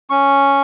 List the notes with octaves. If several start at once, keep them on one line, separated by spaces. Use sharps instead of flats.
C#4 C#6